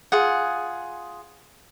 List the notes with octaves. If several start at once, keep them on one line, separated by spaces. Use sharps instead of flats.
F4 G#4 F#5